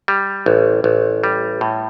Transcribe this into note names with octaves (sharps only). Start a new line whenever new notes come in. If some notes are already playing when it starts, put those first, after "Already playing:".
G3
A1
A1
G3
A2